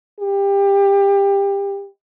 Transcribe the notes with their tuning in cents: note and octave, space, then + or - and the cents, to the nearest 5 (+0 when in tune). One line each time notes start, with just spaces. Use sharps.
G4 +20